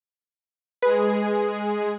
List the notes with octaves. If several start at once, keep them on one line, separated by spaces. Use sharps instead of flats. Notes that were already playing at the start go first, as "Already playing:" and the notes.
G#3 G#4 B4